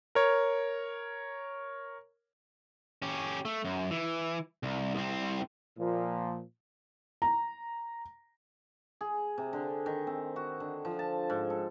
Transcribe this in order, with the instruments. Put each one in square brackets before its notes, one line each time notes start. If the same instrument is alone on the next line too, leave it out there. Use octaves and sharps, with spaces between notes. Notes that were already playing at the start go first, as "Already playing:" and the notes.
[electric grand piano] A#4 C#5
[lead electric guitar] C#4 G4
A3
F#2
E3
C2
C2 C4
[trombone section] A#2 F3
[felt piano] A#5
[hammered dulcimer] G#4
C3
D3
D#3
C4
F#4
D3
F3
A5
G#2
A4